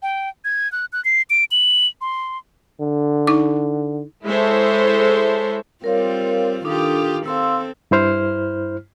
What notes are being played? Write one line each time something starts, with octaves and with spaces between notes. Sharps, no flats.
G5
G#6
F#6
F#6
C7
D7
F#7
C6
D3
D#4 D6
G#3 E4 A4 C5 C#5 E5
G3 C4 F4 A#4 C#5 F5
D#3 D4 F4 G4 A4 D#6
C4 A4 F5 C6 E6
G2 E4 C5 F6